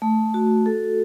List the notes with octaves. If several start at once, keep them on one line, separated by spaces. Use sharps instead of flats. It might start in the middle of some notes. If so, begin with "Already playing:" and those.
A3
F#4
A4